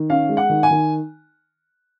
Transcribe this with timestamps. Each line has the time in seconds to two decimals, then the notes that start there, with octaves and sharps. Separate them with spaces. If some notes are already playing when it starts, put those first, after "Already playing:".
Already playing: D#3
0.10 C#4 F5
0.29 G#3
0.37 F#5
0.49 D#3
0.63 G#5
0.71 D#3